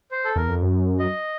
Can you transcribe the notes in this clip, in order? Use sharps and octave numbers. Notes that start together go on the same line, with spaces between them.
C5
A4
E2 A#4
F2
F#2
D#5